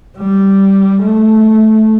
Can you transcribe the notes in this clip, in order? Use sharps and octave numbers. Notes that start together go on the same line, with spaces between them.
G3
A3